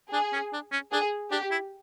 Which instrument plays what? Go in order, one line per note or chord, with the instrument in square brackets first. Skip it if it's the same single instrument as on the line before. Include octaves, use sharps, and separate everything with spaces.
[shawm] D4 [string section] G#4
[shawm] C#4
D4
C#4
[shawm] D4 [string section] G#4
[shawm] D4 [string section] G4
[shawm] E4